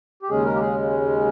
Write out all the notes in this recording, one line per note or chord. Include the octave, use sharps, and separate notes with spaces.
G4
D#2 C#3 G#3 C#4 G#4
A#4
G4
G#4